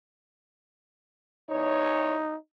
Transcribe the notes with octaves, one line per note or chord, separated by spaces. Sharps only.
E2 D#4 C#5